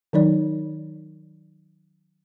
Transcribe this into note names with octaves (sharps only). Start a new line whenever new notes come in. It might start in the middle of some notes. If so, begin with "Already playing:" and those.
D#3 F#3 D#4 D5